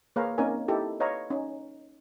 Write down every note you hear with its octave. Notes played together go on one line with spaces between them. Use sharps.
A#3 G#4 B4 C#5 F5 A#5
A#3 C4 C#4 D#4 A#4 G#5
D#4 E4 G4 A4
B4 C#5 D#5 F5 A#5
C#4 D#4